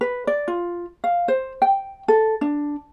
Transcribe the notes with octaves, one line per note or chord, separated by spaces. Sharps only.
B4
D5
F4
F5
C5
G5
A4
D4